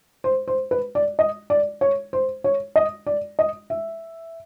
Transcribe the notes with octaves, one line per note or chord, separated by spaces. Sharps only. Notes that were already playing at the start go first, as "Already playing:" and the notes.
C5
C5
B4
D5
D#5
D5
C#5
C5
C#5
D#5
D5
D#5
E5